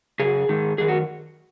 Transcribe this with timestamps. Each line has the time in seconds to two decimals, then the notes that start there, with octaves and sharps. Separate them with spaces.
0.19 F#2 C#3 G#4
0.49 G#2 D#3
0.78 F#2 D#3 G#4
0.88 F#4